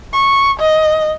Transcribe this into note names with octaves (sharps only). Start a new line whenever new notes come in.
C#6
D#5